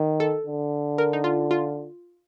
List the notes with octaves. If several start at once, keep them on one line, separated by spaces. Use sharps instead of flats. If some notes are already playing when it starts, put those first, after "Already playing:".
Already playing: D#3
A4
D3
A#4
D#4
F4
F4